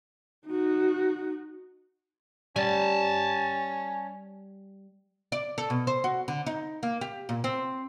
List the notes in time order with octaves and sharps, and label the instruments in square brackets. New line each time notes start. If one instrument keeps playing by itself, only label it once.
[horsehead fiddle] D#4 F#4
[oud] G3 [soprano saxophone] C#4 [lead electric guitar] G#5 A5
[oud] D5
A4
B2
C5
F#4
D3
D#4
A#3
G4
A#2
C4